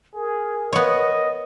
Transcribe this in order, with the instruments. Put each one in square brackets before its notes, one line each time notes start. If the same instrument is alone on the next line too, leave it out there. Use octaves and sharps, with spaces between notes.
[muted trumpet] G#4 [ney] A#4
[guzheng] B3 C#5 [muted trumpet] D#5